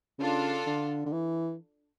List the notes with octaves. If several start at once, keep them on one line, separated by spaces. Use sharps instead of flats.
C#3 D4 F4 A4
D3
D3
E3